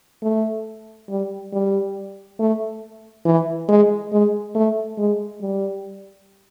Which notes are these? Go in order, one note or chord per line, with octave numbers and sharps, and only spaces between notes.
A3
G3
G3
A3
E3
G#3
G#3
A3
G#3
G3